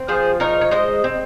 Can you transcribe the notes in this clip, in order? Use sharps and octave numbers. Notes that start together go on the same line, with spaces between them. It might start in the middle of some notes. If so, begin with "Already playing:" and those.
Already playing: C4
F3 G#4 C5
D#4 A#4 C#5
C#5
G#3 C5 D#5
C4